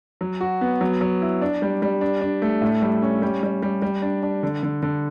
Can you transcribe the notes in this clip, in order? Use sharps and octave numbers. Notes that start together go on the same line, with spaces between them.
F#3
F#4
B3
F#3
F#3
E4
D4
G3
G3
D4
D4
A3
A2
G3
C#4
G3
G3
G3
G3
D4
D4
D3
D3
D3